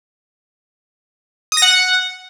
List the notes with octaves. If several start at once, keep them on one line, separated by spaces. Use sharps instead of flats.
D#6
A#6
F#5